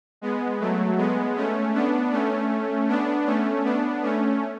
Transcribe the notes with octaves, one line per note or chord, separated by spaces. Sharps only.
G#3 B3
F#3 A3
G#3 B3
A3 C#4
B3 D4
A3 C#4
B3 D4
A3 C#4
B3 D4
A3 C#4